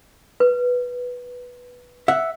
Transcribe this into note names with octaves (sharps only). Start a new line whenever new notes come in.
B4
E5 F#5